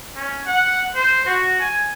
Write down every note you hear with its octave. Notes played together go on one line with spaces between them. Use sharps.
C#4
F#5
C5
F#4
G#5